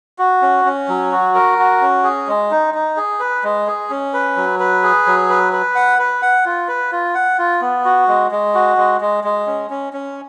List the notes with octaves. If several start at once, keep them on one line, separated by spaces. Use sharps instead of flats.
F#4
C#4
C#4
F#3
F#4
A#4
F#4
C#4
G#4
G#3
D#4
D#4
G#4
B4
G#3
G#4
C#4
B4
F#3
B4
G#4
F#3
B4
B4
F#5
B4
F#5
F4
B4
F4
F#5
F4
B3
F#4
G#3
G#3
F#4
G#3
G#3
G#3
C#4
C#4
C#4